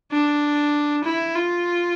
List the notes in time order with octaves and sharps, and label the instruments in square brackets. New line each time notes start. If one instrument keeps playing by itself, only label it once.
[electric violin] D4
E4
F4